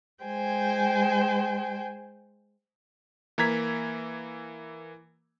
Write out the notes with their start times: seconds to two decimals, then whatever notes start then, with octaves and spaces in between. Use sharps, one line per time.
0.23 G#3 C5 G5 G#5
3.38 E3 A#3 A#5 G#6 B6